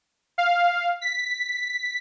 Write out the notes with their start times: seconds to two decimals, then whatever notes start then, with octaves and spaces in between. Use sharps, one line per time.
0.38 F5
1.01 B6